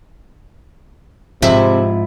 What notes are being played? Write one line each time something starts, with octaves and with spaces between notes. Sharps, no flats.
G#2 C3 F3 E4